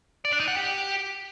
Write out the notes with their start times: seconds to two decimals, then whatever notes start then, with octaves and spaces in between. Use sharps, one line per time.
0.25 D5
0.32 D4
0.40 D#4
0.48 F#5
0.55 G4